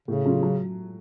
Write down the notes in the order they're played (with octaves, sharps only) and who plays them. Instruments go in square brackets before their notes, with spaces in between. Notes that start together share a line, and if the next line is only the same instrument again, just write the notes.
[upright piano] A2 [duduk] C#3
[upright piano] F#3 C#4 F4
F#3